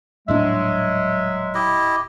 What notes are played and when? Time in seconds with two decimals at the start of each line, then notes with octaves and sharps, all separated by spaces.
0.28 D#1 A2 F#3 G#3 D4 E5
1.55 E4 G4 D#5